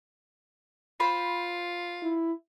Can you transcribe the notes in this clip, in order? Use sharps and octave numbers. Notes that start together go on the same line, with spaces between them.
F4 C5 B5
E4